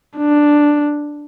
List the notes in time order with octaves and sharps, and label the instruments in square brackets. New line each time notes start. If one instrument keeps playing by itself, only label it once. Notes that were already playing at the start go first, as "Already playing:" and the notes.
[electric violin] D4